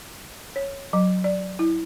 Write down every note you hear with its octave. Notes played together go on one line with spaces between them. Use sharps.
C#5
F#3
D5
E4